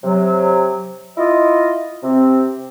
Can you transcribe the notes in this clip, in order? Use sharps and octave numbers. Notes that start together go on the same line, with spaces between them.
C3 F#3
E4 F4 D#5
C3 C4